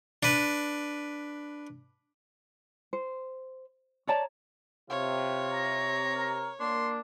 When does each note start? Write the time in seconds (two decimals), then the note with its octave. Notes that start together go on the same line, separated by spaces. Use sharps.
0.23 D4 B4
2.93 C5
4.07 C#5 D5 A5 A#5
4.90 C3 F4 C#5
5.52 A#5
6.15 A#4
6.60 A#3 D4 C6